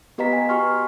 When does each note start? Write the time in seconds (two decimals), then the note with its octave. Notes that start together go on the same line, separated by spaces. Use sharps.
0.18 B3 G4 B4 D#5 A#5 B6
0.33 G#5
0.49 F#4 G4 C6 C#6 F6